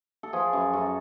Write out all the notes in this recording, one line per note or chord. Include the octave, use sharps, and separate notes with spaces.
A4
F3 G#4
F#2
F#2 A4